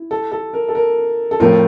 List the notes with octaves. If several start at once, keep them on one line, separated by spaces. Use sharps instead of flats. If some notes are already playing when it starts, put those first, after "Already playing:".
Already playing: E4
A4
A4
A#4
A4
A#4
A4
A2 F3 A3 C4 F4 A#4